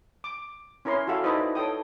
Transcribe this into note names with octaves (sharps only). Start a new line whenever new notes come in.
D6
C#4 E4 A#4 C#5 C6
F#4 G4 A4 E5 F5
D#4 E4 B4 C5 D5 D#5
A4 C#5 G5 D#6